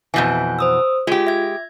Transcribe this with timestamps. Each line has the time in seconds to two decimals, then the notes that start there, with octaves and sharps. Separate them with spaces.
0.14 F2 B2 E3 G#5 G6
0.59 C5 D#6 E6
1.07 G#3 F4 G4
1.27 E5 G#6